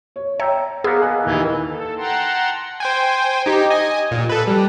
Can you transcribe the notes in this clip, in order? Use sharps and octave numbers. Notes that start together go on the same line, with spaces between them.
C#5
C#5 E5 G5 A#5
A#3 B3 G#4 E6
D#5 G#5 F#6
D#2 D#3 E3 G#6
A4
F#5 G5 A5 A#5 C6
C5 G5 G#5
D#4 G4
D#5 G#5
A#2
A4 B4
G3